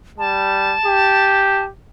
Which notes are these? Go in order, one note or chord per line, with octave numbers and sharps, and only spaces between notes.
G3 A5
G4